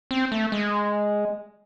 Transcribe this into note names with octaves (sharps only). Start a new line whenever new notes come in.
C4
A3
G#3